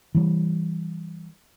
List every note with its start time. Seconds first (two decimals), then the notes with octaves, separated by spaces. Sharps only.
0.15 E3 G3